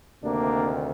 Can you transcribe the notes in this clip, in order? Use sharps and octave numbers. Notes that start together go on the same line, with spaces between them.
D2 C3 D#3 A#3 D4